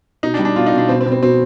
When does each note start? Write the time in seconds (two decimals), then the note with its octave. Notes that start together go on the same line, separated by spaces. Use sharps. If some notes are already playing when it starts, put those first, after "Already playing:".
0.23 B2 D#4
0.34 D4
0.39 G3
0.45 D4
0.56 B2 F4
0.67 D#4
0.73 B2
0.78 D4
0.89 B2 C4
1.01 C4
1.06 B2
1.12 C4
1.22 B2 C4